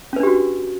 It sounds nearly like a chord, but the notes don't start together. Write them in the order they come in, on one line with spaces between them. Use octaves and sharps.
C#4 B4 D4 G4 F#4